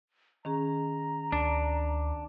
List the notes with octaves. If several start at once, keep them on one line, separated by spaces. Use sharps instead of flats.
D#3 C#4 G#4 A#5
D2 D4